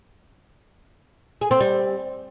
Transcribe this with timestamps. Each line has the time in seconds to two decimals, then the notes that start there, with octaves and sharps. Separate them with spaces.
1.41 G#4
1.51 C4
1.60 G3